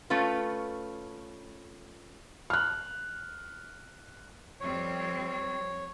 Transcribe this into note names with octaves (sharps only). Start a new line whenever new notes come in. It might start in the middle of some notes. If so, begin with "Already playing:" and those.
A3 C#4 F4 B4
F6 F#6
F2 G3 C4 C#5